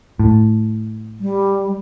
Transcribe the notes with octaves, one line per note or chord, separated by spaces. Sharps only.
A2
G3